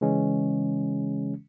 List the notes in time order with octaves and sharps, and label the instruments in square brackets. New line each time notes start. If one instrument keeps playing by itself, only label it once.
[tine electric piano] C#3 E3 G#3 C#4